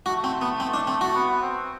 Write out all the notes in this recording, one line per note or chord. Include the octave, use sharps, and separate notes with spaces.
A3 F#4
C4
B3
C4
D4
C4
F#4
B3
C4